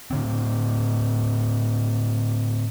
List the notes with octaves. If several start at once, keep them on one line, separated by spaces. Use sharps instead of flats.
A2 D3 C4